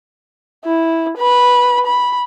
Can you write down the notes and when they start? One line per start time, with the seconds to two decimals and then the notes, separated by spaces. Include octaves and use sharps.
0.65 E4
1.17 B4 B5
1.86 B5